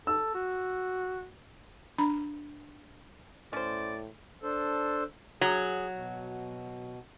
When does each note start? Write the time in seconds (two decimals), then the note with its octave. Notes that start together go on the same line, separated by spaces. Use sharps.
0.07 A4 E6
0.35 F#4
1.98 D4 A#5 B5
3.53 A2 C#4 C5 D5
4.43 D4 A4 C5
5.41 F#3 G#4
5.93 B2